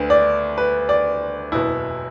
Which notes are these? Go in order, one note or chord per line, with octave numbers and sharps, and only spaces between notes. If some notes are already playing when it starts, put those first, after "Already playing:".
Already playing: D2 D3 B4
D5
B4
D5
F#1 E2 B2 E4